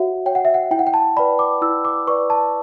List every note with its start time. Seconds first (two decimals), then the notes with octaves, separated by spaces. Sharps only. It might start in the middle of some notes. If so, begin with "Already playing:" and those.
Already playing: F#4 C#5 E5 F#5
0.26 C#5 G5
0.35 F#5
0.45 E5
0.54 F#5
0.71 E4 G5
0.79 F#5
0.87 G5
0.94 A5
1.17 B4 D5 B5
1.39 D6
1.62 E4 E6
1.85 D6
2.07 B4 D5 C#6
2.30 A5